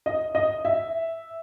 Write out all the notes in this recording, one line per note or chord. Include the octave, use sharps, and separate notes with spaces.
D#5
D#5
E5